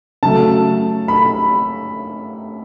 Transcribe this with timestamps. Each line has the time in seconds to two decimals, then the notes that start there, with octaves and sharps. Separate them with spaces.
0.23 C#3 F#3 A3 A5
1.08 B5